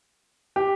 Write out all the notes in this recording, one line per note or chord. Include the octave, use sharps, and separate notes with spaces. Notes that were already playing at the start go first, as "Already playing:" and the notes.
G4